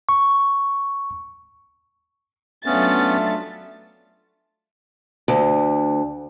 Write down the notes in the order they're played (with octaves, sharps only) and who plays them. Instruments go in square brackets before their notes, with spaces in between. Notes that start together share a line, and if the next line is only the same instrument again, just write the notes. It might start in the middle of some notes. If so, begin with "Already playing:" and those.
[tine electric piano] C#6
[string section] F#3 F4 A6 [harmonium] A3 D4 E5 [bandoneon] B3 C#4
[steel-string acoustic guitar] D2